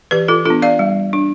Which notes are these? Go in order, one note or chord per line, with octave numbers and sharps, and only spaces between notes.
E3 G4 B4
F4 A4
B3 D4 F4 A4
D5 F5
G3
D4